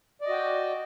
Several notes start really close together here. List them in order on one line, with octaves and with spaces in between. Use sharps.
D5 D#5 F#4 G5